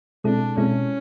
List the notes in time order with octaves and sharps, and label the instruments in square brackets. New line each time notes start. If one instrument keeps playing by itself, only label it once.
[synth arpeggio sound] B2 G#3 C4 E4 A4 [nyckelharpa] D4
[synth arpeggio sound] B2 G#3 C4 E4 A4 [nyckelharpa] C#4